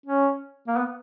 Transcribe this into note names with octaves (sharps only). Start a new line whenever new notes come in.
C#4
A#3
B3